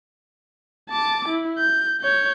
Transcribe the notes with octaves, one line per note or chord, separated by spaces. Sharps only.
A5 D6
E4
G6
C#5 G6